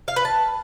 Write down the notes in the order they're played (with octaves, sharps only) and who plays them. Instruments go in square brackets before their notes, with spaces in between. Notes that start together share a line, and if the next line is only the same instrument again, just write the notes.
[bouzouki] F5
B4
A5